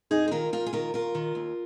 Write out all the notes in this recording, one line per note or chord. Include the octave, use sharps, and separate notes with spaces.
F2 D#4 G#4
C5
D#3 F4 A#4
F2 F4 A#4
G#4
D#3 F4 A#4
D#2 F4 A#4
D#3
D#2